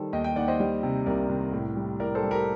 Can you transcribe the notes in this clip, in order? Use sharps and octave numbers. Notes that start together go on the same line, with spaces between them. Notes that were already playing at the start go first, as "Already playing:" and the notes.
Already playing: D#3 G3 A4 C5
D#2 D#5 G5
D#5 G5
D#2 D5 F#5
C5 D#5
G3
C3
C2 A#4 D5
C2
A2
G3
A2 A#4 D5
A4 C5
G3
G4 A#4